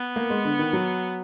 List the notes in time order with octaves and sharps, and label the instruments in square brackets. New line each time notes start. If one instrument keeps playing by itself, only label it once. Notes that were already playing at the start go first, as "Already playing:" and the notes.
Already playing: [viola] B3
[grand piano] A#3
G#3
D3
D#3
F#3